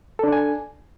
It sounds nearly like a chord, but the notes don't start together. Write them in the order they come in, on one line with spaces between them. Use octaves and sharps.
A4 D4 D5 G#5